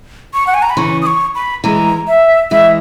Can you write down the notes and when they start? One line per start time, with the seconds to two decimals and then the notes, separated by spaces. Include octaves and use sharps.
0.34 C#6
0.47 F#5
0.54 G#5
0.62 A#5
0.70 B5
0.77 C#3 E3 C#6
1.02 D#6
1.06 C#6
1.35 B5
1.64 E3 G#3 A#5
2.08 E5
2.51 E3 G#3 E5